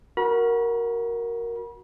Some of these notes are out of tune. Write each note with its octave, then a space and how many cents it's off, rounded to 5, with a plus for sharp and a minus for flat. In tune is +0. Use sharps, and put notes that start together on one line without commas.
F#4 +0 A#4 +0 B5 -40